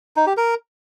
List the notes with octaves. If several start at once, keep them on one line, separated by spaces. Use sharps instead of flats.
D#4
G4
A#4